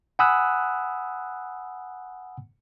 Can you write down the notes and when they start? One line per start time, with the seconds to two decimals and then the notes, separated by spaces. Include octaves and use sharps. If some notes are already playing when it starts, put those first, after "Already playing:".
0.19 F#5 G#5 B5 D#6 E6 F#6